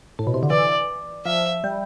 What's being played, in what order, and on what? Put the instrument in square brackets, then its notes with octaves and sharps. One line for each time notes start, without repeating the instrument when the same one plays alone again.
[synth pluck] A2
B2
C3
D3
[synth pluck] E3 [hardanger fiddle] D5
[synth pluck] F3 [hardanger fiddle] E5
[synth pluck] G3